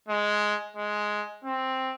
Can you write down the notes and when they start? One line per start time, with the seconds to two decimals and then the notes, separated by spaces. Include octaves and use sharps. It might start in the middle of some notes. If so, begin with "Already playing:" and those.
0.08 G#3
0.77 G#3
1.45 C4